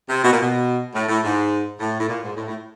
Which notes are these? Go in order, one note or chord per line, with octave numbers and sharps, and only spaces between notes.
C3
B2
A#2
B2
A2
A2
G#2
A2
A2
A#2
G#2
A2
A2